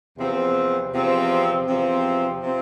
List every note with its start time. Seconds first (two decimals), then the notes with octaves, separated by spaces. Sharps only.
0.18 E2 C3 F3 C4
0.92 E2 C3 F3 C4
1.67 E2 C3 F3 C4
2.43 C3 F3 C4